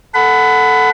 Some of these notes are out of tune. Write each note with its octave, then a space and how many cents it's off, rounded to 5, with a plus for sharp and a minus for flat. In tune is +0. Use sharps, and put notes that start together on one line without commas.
A4 +0 F#5 +0 B5 +20